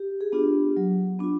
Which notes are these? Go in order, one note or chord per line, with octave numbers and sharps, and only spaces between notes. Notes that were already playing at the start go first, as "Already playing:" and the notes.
Already playing: G4
G#4
B3 D4 F4 G4
F#3
B3 D4 F4